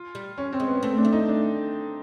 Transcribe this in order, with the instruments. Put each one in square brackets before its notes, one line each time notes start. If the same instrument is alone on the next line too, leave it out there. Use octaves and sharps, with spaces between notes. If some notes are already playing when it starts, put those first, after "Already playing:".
Already playing: [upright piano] F4
[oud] G3
[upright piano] C#4
C4
[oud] G#3
[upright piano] B3
[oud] A3 [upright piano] C4
[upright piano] D4
[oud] A3
[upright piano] D#4
D4